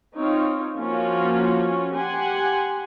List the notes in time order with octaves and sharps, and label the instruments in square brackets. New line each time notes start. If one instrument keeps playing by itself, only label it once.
[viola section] C4 D#4 F4 C#5
F3 A#3 C#4 F4 F#4 C#5
G4 F#5 G#5 C6